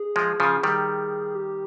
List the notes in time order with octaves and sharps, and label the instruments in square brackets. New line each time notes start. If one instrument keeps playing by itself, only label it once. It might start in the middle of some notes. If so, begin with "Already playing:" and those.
Already playing: [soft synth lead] G#4
[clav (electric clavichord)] F3 G#3
C#3 F3
D#3 G3
[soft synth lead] G4